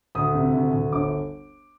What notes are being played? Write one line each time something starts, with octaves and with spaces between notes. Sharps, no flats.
D2 D#6
C3
D2
D2
G1 D6